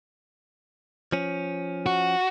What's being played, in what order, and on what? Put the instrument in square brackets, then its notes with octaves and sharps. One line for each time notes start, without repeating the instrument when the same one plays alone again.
[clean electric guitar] F3 C#4
[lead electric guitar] F#4